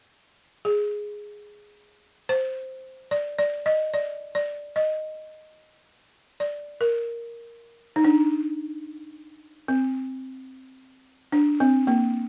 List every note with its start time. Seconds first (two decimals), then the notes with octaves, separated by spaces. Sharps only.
0.65 G#4
2.29 C5
3.11 D5
3.39 D5
3.66 D#5
3.94 D5
4.35 D5
4.76 D#5
6.40 D5
6.81 A#4
7.96 D#4
8.04 D4
9.68 C4
11.32 D4
11.60 C4
11.87 A#3